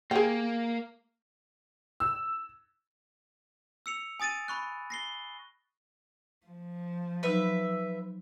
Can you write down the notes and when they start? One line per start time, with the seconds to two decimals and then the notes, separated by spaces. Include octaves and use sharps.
0.11 A#3 G#4 G5
2.00 E6
3.86 E6 C#7 F7
4.20 G#5 D#6 A6 D7 D#7
4.48 B5 C#6 F#6
4.90 A#6 C7 G7
6.46 F3
7.23 F#3 D#4 B4 E5